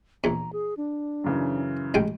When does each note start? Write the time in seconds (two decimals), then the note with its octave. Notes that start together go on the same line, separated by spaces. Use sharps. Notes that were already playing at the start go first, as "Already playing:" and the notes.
0.24 A#1 E2 A#5
0.53 G#4
0.77 D4
1.24 F#2 C#3 E3
1.94 A1 G#3 G5